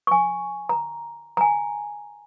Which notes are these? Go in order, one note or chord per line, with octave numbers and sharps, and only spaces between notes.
G#5 C#6
A#5
G#5 A#5